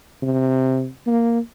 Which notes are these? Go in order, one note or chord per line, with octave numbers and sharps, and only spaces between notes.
C3
A#3